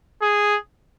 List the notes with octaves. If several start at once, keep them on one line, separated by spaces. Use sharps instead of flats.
G#4